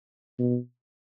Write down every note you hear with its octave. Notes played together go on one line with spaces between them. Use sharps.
B2